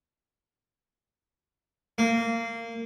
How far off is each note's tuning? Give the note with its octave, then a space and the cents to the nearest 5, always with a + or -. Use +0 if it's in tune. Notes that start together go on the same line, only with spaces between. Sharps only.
A#3 -20